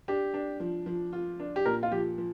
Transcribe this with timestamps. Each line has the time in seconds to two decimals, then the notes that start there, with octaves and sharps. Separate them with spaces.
0.08 D4 G4
0.34 D4
0.60 F3
0.86 F3
1.13 F4
1.40 D4
1.56 G4
1.66 A#2 A#4
1.83 F4
1.91 F3 G4
2.18 F3